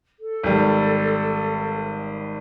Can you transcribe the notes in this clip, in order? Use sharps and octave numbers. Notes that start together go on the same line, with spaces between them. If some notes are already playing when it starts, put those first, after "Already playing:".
A4
G#1 G3